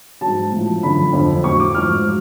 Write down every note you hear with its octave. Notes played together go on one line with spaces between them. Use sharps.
G#2 F#3 A5
A2 F3
F#2 D3 F3 B5
F2 D3 F3
A2 F#3 C#6
D6
G#2 F3 F6
F#3